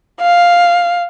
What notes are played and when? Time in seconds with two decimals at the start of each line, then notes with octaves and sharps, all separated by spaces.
0.20 F5